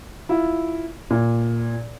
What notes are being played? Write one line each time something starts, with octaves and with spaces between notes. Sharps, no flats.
E4 F4
A#2